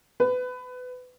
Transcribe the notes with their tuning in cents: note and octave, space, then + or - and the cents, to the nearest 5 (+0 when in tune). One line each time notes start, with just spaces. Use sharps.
B4 +25